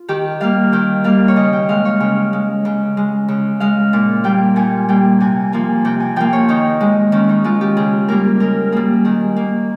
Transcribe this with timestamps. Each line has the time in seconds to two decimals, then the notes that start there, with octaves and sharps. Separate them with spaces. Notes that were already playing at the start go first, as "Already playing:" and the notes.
Already playing: F4
0.08 D#3 G4
0.40 G3 A#3 F5
0.72 D#3 G5
1.04 G3 A#3 F5
1.28 C#5
1.36 C#3 D#5
1.53 G5
1.69 G#3 F5
1.85 C#5
2.00 C#3
2.33 G#3
2.65 C#3
2.97 G#3
3.28 C#3
3.60 G#3 F5
3.93 A#2
4.24 G3 A#3 G5
4.56 A#2 G#5
4.89 G3 A#3 G5
5.20 C3 G#5
5.53 F3 A#3 G#5
5.85 C3 G5
6.00 G#5
6.16 F3 A#3 G5
6.33 C#5
6.49 D#3 D#4
6.81 G#3
7.12 D#3 C#4
7.29 D#4
7.44 G#3 F4
7.61 G4
7.77 C#3 G#4
8.08 G3 A#3 A#4
8.40 C#3 A#4
8.72 G3 A#3 G#4
9.05 D#3 G#4
9.37 A#3